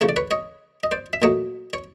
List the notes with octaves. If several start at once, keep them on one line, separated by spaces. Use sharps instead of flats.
C#3 F3 A3 C#5
D5
B4 C#5
C#5 D#5
D#5
C5 D5
E5
A#2 F#3 A3 C#5 D#5
C#5